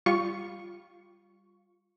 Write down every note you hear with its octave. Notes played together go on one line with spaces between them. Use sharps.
G3 F4 C#6